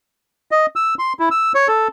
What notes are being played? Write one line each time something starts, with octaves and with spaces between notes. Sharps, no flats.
D#5
E6
C6
E4
E6
C#5
A4